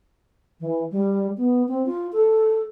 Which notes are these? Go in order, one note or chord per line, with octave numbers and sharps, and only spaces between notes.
E3
G3
B3
C4
F4
A4